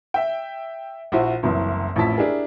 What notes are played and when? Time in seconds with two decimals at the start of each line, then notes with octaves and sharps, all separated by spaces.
0.14 E5 G5
1.12 A#1 E4 F#4 C5
1.43 F#1 C2 F#2 E3
1.96 A1 F2 E4 A5 B6
2.17 D4 E4 G4 G#4 A#4